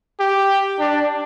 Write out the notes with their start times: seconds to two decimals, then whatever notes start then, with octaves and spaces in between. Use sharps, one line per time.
0.20 G4
0.80 D4